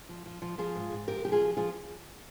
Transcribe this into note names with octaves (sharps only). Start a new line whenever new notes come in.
F3
F3
F3
F3 F4 G#4
G#2
G#2
F3 G4 A#4
F3 G4
F4 G#4
F3
F3 F4 G#4